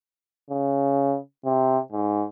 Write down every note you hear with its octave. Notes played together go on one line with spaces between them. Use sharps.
C#3
C3
G#2